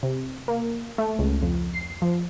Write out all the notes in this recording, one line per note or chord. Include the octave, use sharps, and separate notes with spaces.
C3
A#3
A3
C#2
F2
C7
F3